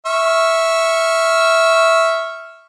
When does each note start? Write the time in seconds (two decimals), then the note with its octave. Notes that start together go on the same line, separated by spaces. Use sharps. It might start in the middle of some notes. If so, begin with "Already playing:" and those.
0.06 E5 C#6 F6